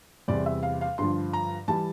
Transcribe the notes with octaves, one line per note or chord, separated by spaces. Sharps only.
E2 C3 G3 D5
E5
F5
F5
G2 D3 F3 C6
A#5
E3 G3 A5